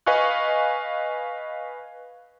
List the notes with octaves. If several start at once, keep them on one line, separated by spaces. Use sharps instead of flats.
B4 D#5 F5 G#5 C#6 F#6